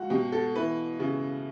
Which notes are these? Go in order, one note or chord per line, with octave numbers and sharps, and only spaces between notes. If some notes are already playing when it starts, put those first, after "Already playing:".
Already playing: C#2 F#4
B2 G4
A4
E3 B4
C#3